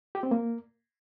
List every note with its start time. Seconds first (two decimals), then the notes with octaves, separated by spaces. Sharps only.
0.15 G4
0.23 C4
0.31 A#3